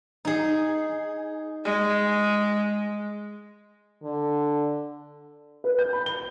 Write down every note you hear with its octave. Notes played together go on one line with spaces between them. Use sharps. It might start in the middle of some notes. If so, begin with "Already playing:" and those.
D#4 G#4
G#3
D3
B4
G6
B5
G7